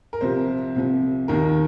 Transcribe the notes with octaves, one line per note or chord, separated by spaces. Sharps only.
A#4
C2 C3 F3 C5
C2 C3 F3
D#2 D#3 A#4